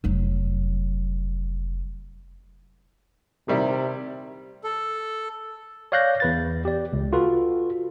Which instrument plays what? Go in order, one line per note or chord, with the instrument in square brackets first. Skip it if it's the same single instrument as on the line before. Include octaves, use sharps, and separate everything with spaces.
[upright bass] F1 F#3
[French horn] C3 [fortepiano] D#3 G3 E4
[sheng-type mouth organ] A4
[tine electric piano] C#5 D5 F5 F#6 G6 A#6
E2 B4 A6
G4 D5
C#2
F4 F#4 A4 B4